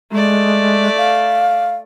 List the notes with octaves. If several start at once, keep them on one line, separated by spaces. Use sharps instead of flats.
G#3 A3 D5
F5